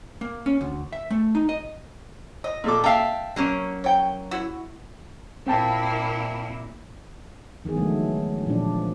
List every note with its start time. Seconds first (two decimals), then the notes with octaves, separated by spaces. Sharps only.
0.21 A#3
0.46 C#4
0.61 D2
0.93 E5
1.10 A3
1.35 D#4
1.49 D#5
2.44 D#5
2.64 A#2 A4 D6
2.84 E5 F5 G5 A5
3.36 F#3 A#3 C#4
3.84 C#5 G5
4.31 E4 F#4
5.47 A#2 A#3 C4 E4 G5 A5
7.65 D#3 E3 B3 G#4
7.77 D3 E3 F#3 G#3 A3
8.46 A#2 F3 D4